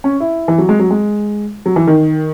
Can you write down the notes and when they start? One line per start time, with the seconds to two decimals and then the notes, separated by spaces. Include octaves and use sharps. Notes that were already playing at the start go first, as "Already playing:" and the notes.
0.04 C#4
0.20 E4
0.48 E3
0.58 F#3
0.69 G#3
0.79 F#3
0.91 G#3
1.66 F#3
1.76 E3
1.87 D#3